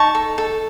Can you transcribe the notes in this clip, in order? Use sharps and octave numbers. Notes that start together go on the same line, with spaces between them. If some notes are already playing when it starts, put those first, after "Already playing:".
Already playing: D#4 A5 C#6
A4
A4